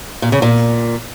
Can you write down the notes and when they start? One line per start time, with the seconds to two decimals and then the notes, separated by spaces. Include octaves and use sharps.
0.22 A#2
0.32 C#3
0.42 A#2